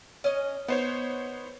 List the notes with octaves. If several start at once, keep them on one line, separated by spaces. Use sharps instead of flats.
C#4 D#5
B3 D#4 C5 C#5